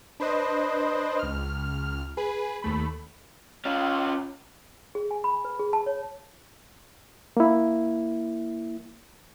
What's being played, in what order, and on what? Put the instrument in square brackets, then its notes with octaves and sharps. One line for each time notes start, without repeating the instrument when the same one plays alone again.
[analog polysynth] D4 B4 C5 D#5
C#2 F6
G#4 B4
D#2 A3 B5
[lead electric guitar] C#4 F4
[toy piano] G#4
G#5
B5
B4
G#4
A5
C#5
[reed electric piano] A#3 E4